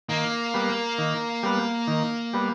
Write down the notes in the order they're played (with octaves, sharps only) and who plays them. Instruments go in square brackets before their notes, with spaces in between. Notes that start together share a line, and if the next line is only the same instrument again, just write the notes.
[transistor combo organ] D#3 [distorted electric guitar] A#3
[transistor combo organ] G3 B3
D#3
G3 B3
D#3
G3 B3